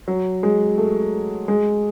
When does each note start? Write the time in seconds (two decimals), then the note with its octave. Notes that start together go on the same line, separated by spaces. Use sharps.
0.08 F#3
0.43 G#3
0.78 A3
1.48 G#3